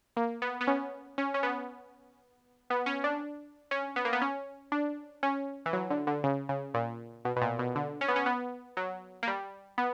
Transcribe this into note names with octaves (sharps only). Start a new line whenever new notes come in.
A#3
B3
B3
C#4
C#4
C#4
B3
B3
C#4
D4
C#4
B3
A#3
B3
C#4
D4
C#4
E3
F#3
D3
D3
C#3
C#3
A#2
B2
B2
A#2
B2
D3
C#4
B3
C#4
B3
F#3
A#3
G3
B3